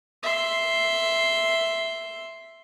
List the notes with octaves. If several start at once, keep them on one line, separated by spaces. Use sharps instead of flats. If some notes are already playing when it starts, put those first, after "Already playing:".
E5 C6